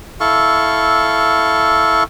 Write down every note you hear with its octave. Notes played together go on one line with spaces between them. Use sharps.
E4 A4 F5 C#6